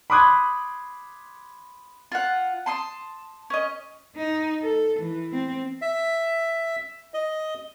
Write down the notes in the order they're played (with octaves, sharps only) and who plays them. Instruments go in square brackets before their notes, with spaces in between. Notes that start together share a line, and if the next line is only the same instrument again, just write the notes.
[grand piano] B5 C6 D6 D#6 F#6 G#6
[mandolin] F4 F#5
A5 C6 D#6
C#4 D#5
[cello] D#4
A4
E3
C4
[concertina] E5
D#5